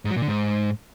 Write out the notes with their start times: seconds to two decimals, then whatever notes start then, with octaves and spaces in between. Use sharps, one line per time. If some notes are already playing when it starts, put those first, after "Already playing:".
0.05 G#2
0.11 F#3
0.16 A#2
0.22 D3
0.28 G#2